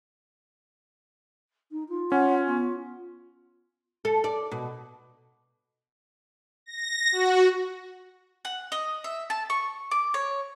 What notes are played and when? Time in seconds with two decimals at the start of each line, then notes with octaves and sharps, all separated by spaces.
1.71 D#4
1.88 F4
2.12 C#4 F#5
2.47 B3
4.05 A4
4.24 D5
4.52 B2
6.66 A#6
7.12 F#4
8.45 F#5
8.72 D#5
9.04 E5
9.30 A5
9.50 C#6
9.91 D6
10.14 C#5